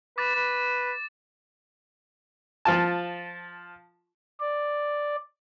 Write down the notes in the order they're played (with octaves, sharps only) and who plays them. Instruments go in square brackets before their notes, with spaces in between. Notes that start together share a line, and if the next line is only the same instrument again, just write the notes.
[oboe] B4 [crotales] D6 A6
[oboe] B4
[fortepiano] F3 F4 A5
[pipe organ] D5